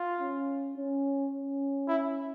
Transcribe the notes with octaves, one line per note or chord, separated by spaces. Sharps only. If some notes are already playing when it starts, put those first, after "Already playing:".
Already playing: F4
C#4
C#4
C#4
E4